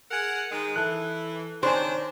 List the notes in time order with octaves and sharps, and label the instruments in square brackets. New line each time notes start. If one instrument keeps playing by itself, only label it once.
[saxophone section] G#4 A#4 F#5
D#3 G#3
[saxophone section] E3 [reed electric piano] A4 F#6
[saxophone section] D#3 C4 D4 [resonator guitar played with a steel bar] C5 [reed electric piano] C#5 G#5